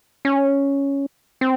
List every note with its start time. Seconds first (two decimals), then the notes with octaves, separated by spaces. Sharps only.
0.25 C#4
1.41 C4